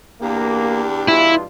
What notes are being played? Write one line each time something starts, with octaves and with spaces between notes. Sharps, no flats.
E2 A#3 D4 G4
G2 B2 E4 F4